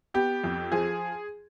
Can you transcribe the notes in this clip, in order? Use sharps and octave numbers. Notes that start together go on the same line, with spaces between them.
B3 G4
F2
F3 G#4